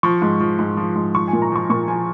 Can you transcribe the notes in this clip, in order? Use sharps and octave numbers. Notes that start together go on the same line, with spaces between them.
F3 C#6
G#2
F3
G#2
F3
G#2
F3 C#6
G#5
A#2
A#5
F3 C#6
A#2 C#6
F3 G#5